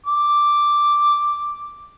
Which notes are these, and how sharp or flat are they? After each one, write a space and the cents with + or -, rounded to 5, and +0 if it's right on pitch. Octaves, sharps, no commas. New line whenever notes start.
D6 +0